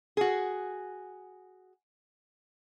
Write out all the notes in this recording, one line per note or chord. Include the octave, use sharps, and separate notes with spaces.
F#4 G#4